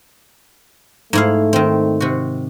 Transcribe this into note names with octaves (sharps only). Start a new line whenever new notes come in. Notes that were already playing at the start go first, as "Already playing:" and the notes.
G#2 A3 E4 F5
D#3 C4
C3 F#4